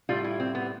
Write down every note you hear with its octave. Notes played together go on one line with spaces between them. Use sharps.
A2 G3 F4
E4
C4
B3